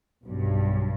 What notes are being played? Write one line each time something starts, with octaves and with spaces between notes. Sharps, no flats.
B1 G2